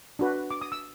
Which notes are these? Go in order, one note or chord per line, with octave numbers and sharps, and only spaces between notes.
D4 F#4 B4
D6
D#6
E6